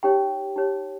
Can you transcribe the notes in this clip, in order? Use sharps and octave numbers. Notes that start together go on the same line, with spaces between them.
D#4 G4 C#5 G5
D#4 G4 C#5